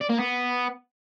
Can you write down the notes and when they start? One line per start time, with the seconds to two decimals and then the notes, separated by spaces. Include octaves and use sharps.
0.01 D5
0.10 A#3
0.19 B3